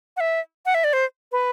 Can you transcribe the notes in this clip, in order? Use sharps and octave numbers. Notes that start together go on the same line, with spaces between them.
F#5
E5
F#5
E5
D5
C5
B4